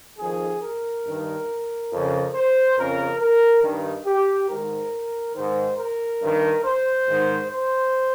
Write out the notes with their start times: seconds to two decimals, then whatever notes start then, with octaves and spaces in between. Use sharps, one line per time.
0.19 F2 D#3 G#4
0.62 A#4
1.05 G2 D#3
1.91 F2 C#3
2.34 C5
2.77 F2 C#3 A#4
3.20 A#4
3.63 G2 D#3
4.06 G4
4.49 G#2 D#3 A#4
5.35 G#2 D#3 C5
5.78 A#4
6.21 G2 D#3
6.64 C5
7.07 G#2 D#3
7.51 C5